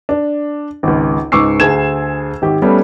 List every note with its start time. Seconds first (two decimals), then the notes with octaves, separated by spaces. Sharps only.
0.09 D4
0.83 G#1 C#2
1.32 C#2 G#2 C#6 D6 E6 C7
1.60 D2 G#4 A5 G#6 E7
2.42 G#1 G4
2.62 G3 A3 B3 C#4